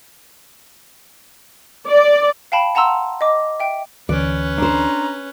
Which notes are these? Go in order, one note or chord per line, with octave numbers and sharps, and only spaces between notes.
D5
F5 G5 A5 B5
F#5 A5 A#5 C6 E6
D#5 D6
E5 G5
D2 D3 E3 C#4 B4 D5
D4 C5 A#5